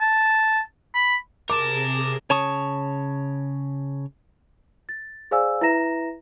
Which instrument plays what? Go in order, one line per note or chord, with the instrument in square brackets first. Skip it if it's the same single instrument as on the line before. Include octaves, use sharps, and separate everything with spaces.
[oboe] A5
B5
[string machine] C3 G#4 [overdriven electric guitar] A#4 [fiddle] A5 [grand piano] D6
[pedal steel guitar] C#3 C#5 A5 C#6 D#6
[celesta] A6
G#4 C5 D5 F5 G#5 E6
E4 B4 E5 A#5 A#6 E7